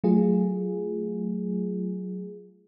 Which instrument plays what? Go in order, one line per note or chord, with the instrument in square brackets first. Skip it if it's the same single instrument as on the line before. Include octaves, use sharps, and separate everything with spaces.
[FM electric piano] F#3 A3 F4 G#4